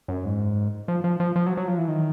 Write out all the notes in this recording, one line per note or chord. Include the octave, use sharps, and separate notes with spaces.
F#2
G#2
F3
F3
F3
F3
F#3
F#3
F3
E3
D#3